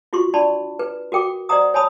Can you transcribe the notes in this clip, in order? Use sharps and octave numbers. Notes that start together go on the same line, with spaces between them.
F4 F#4 C6 C#6
D4 D5 A5 B5 C6
B4
F#4 A#4 G5 D6
C5 D5 D#5 F#5 A#5 D#6
C#5 G#5 A5 B5 D#6